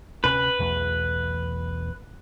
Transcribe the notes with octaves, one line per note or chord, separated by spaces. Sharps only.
D2 C3 C#4 B4
B1 E2 A3